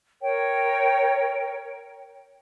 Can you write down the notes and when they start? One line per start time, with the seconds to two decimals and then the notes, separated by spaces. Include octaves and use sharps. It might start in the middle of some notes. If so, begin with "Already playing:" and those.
0.22 A#4 C#5 G5